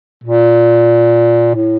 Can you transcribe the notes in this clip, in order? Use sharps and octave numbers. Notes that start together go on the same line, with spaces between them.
A#2
A2